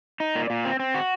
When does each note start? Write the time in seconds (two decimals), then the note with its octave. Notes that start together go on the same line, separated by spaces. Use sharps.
0.20 D#4
0.35 A#2
0.50 A#2
0.65 C4
0.80 C4
0.94 F#4